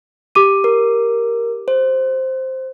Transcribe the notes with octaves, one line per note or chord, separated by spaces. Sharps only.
G4 D6 D#7
A#4
C5